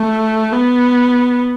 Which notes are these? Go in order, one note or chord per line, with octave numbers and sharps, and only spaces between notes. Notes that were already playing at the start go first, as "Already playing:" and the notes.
Already playing: A3
B3